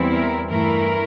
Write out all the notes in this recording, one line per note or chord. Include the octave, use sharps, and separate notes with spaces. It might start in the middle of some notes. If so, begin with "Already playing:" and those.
Already playing: E2 E3 G3 C4 E4
A#4
G2 E3 A3 E4 A#4